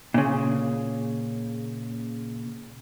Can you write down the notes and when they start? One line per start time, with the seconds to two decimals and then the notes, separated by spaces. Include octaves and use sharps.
0.14 A#2 C#3